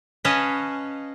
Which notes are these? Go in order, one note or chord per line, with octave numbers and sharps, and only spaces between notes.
C#4 B4 C#5 D#5 F5 A5